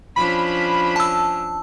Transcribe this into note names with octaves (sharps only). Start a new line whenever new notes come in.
F3 C#4 D4 B5
A5 E6